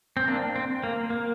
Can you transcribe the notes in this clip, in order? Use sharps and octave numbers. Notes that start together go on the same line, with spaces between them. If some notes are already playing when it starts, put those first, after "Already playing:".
C4
A#3 D4
C4
A#3
A#3